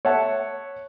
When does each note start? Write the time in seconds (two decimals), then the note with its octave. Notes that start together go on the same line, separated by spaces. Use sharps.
0.05 C#5 E5 F#5 A5